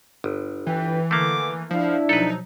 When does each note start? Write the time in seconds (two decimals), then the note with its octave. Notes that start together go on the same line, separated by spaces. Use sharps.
0.24 G1
0.67 E3 B4 G5
1.11 D3 A3 A#3 D6
1.71 F3 D4 E4 F5
2.09 B2 F3 F#3 D#4 A4 B4